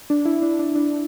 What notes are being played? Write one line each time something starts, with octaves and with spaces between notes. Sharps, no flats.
D4
E4
D4
D4
D4